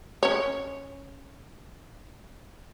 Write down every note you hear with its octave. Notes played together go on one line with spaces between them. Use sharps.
C#4 C#5